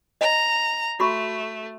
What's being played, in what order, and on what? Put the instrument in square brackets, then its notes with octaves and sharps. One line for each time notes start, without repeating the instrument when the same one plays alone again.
[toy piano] D#5 [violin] A#5
[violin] A3 [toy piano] F#4 B5 C#6